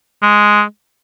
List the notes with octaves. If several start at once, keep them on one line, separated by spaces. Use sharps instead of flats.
G#3